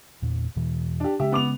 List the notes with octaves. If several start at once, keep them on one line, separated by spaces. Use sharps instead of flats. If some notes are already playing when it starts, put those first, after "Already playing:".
E2 A#2
E2 B2 E3
D4 G4
C#3 G#3 C#4 G4 E5
B3 D6 F7